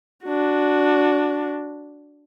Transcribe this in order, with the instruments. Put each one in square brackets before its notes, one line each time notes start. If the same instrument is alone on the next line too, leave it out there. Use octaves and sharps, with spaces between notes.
[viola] D4 F#4